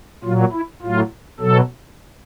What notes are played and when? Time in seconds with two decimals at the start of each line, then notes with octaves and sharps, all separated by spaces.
0.24 A#2 F#3 F4
0.52 E4
0.82 A2 F#3 F4
1.40 B2 F#3 A4